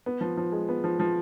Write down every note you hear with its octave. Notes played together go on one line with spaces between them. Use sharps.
B3
F3
F3
G#3
B3
F3
F3